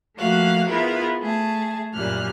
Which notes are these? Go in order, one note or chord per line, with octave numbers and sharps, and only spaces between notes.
F3 A3 A#3 F#4 F5 F#6
B3 E4 F4 G#4 A#4 B4
A3 G#4 A5
F#2 A#2 G3 F6 F#6